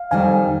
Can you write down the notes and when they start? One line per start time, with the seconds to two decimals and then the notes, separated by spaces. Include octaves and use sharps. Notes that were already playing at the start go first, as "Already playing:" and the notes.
Already playing: F5
0.11 F2 D#3 G3 F5 G#5